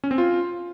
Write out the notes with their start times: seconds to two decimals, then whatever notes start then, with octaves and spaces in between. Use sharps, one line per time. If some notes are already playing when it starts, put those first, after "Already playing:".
0.04 C#4
0.11 C4
0.18 F4